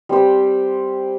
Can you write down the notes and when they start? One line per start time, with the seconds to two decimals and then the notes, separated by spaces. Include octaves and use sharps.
0.09 G3 C4 G4 C5